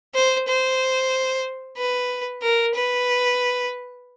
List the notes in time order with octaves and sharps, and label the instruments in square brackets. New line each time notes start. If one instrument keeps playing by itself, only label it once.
[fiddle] C5
C5
B4
A#4
B4